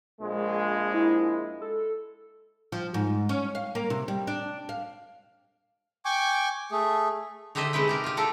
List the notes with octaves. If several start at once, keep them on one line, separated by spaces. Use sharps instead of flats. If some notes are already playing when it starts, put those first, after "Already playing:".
A#1 G#3
E4
A4
F3
G#2
C#4
F5
A#3
C3
G3
D4
F5
G5 G#5 C#6 D6
A3 G#4
D3 D#4 G4 C5 D#5 E5
C3 G#3 D#4 B4 G5
C3 G4 A#4
F4 G4
D4 F4 A4 A#4